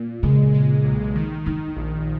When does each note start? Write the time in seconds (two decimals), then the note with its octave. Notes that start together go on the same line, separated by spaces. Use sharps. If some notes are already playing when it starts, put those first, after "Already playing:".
Already playing: A#2
0.23 C#3 G#3
0.54 G#3
0.84 B1
1.15 D#3
1.46 D#3 D#4
1.76 A#1